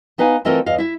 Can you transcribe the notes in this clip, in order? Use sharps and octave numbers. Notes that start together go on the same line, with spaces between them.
B3 D#4 B4 F5 G#5
E3 A3 C4 F4 A#4 D#5
E2 D#5 F5
E4 E5